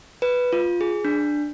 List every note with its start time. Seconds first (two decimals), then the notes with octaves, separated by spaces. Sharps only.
0.22 B4
0.53 F4
0.81 G#4
1.05 D4